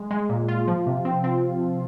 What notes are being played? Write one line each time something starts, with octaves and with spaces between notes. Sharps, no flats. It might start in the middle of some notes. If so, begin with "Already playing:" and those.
Already playing: G#3
G#3
A#2
F4
F3
C3
C4
C4